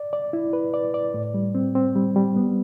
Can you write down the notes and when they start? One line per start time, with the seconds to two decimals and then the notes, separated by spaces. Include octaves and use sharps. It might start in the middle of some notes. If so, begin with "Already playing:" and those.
Already playing: D5
0.13 D5
0.33 E4
0.53 B4
0.74 D5
0.94 D5
1.14 A2
1.34 G3
1.55 C4
1.75 C4
1.96 G3
2.16 G3
2.36 B3